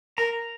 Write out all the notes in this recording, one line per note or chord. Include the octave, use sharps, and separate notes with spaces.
A#4 A#5